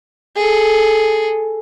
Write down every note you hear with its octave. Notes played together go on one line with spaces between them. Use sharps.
G#4 A4